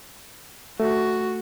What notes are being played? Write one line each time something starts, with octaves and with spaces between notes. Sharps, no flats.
A3 F#4